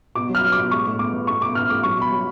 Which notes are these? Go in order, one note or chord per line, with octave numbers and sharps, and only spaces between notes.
B2 D6
F#3
F6
F#3
D6
B2
G#3 C#6
A2
B3 D6
B3
A3 C#6
B2 D6
B2 F6
A3 D6
F#3 C#6
B2 B5
F#3